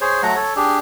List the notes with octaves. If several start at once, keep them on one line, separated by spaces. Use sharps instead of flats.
G#4 C5 C#5
F#3 A3 F#5 A#5
A4 C#5
D4 G4 G#4